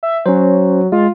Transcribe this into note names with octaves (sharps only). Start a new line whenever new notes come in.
E5
F#3 C#4 C5
G#3 F4